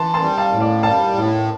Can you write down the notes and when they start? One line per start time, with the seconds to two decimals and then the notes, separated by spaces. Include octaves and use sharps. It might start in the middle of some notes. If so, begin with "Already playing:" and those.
Already playing: E3 A5 C6
0.14 A5 C6
0.22 G3
0.38 F5 A5
0.53 A2
0.60 D5 F5
0.83 G3 F5 A5
1.14 A2